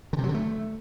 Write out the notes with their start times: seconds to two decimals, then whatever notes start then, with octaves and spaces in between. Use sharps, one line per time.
0.13 D3
0.18 C3
0.24 F#3
0.29 D3
0.34 A3